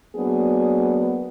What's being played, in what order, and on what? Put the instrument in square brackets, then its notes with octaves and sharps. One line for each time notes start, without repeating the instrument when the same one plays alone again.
[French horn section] F#3 A#3 B3 D4 G#4